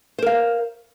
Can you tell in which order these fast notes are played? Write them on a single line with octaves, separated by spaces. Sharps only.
C5 A#4 F5